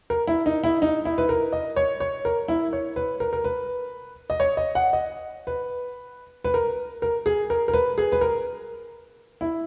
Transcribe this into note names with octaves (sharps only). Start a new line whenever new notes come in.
A#4
E4
D#4
E4
D#4
E4
B4
A#4
D#5
C#5
C#5
A#4
E4
C#5
B4
A#4
A#4
B4
D#5
C#5
D#5
F#5
D#5
B4
B4
A#4
A#4
G#4
A#4
A#4
B4
G#4
B4
A#4
E4